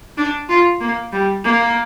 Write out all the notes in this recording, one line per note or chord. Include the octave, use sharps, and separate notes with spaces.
D4
F4
A#3
G3
A#3